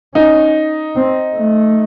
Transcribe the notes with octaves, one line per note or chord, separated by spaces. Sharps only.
C#4 D#4
C4
A3